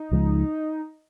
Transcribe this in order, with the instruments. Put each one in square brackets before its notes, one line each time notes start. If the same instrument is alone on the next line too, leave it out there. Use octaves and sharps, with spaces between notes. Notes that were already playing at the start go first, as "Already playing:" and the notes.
Already playing: [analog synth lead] D#4
[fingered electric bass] C#2 C#3 F3 G#3